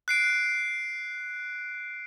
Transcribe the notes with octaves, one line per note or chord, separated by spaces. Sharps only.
F#6 C7 D7